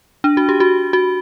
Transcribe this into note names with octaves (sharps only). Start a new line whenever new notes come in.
D4
F#4
G4
F#4
F#4